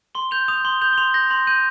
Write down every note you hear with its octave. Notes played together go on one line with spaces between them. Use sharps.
C6 G7
G6 F7
D#6 F7
C6 G7
G6 F7
G7
C6 F7
G6 A#6
C6 F7
G6 D#7